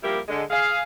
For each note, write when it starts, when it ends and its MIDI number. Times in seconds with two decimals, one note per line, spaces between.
0.03 0.19 53
0.03 0.19 55
0.03 0.19 58
0.03 0.19 64
0.03 0.19 67
0.03 0.19 70
0.27 0.42 50
0.27 0.42 56
0.50 0.81 68
0.50 0.81 77